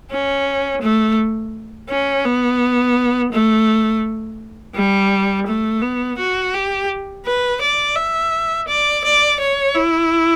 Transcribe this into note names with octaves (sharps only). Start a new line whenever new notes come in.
C#4
A3
C#4
B3
A3
G3
A3
B3
F#4
G4
B4
D5
E5
D5
D5
C#5
E4